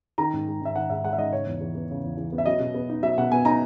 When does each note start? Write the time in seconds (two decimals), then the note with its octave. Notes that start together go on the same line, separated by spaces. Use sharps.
0.18 D#3 A#5
0.33 G#2
0.47 G#3
0.61 G#2 E5
0.75 D#3 F#5
0.90 G#2 E5
1.04 G#3 F#5
1.13 E5
1.18 G#2 D#5
1.33 C#3 C#5
1.47 E2
1.61 E3
1.75 B3
1.90 C#3
2.04 E2
2.17 E3
2.33 B3
2.38 E5
2.46 F#3 D#5
2.60 B2
2.74 B3
2.89 D#4
3.03 F#3 E5
3.18 B2 F#5
3.31 B3 G#5
3.45 D#4 A#5